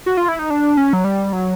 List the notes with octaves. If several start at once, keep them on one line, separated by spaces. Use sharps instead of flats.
F#4
F4
E4
D#4
D4
C#4
F#3
G3
F#3